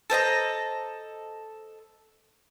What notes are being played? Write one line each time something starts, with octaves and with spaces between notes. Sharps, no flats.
A4 C5 D#5 A#5